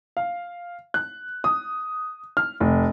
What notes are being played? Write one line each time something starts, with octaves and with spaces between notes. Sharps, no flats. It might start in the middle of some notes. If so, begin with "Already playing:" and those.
F5
F#6
D#6
F6
F1